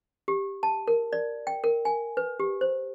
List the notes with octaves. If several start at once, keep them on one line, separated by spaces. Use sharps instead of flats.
G4
A5
A#4
D5
G5
A#4
G#5
B4
G4
C5